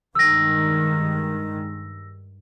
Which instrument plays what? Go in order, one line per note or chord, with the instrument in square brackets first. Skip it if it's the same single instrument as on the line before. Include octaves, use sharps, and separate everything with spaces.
[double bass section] G2 D#3 G#3 [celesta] E6 A#6